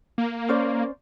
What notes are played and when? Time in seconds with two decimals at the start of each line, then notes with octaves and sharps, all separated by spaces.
0.18 A#3
0.49 C#4 C5 D5